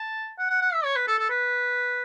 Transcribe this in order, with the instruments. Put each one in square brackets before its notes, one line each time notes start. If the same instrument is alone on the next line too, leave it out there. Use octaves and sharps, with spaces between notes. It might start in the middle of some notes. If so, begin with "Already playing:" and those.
Already playing: [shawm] A5
F#5
F#5
F#5
E5
C#5
B4
A4
A4
B4